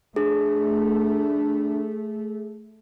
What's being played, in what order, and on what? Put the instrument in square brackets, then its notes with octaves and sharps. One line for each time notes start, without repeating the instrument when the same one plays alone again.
[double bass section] A3 [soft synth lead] D4 [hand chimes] G#4